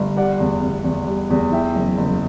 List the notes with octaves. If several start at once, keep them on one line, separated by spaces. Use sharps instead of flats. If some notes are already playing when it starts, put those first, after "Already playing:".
Already playing: G1
G3 D5 F#5
E2
E2
E2
G3
E2
E3 E5 G5
F#1
F#1